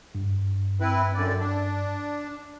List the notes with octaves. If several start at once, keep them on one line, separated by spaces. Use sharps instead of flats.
G2
C4 E4 B4
F#2 D3 D5
D4